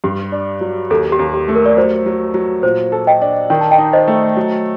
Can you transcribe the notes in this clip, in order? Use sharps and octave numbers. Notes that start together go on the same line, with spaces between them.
G2 G4
D4
F#3
D#2 A4
G4
D#2
G4
A3
A#4
D5
F#3 C5
F#3
F#3
A#2 C5
A4
D#5 G5
D4
D#3 G5
A5
D#5 G5
D#4
C5 D#5
A3
F#3